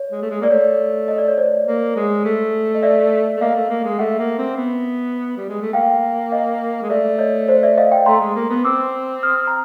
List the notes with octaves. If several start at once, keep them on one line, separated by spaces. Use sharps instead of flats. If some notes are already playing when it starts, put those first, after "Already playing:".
Already playing: C#5
G#3
A3
G#3
A#3 D5
A3 C#5
D#5
D5
C#5
C5 D5
A#3
G#3
A3
D#5
D5 E5
A3
A#3 D#5 F5
A3
A#3
G#3
A3 E5 F#5
A#3
C4
B3
G3
G#3
A3
A#3 F5 G5
D#5 F5
G#3
A3 D5 E5
C#5 D#5
C5 D5
D5 E5
D#5 F5
F5 G5
A3 A#5 C6
G#3
A#3
B3
C4 D6 E6
D#6 F6
A#5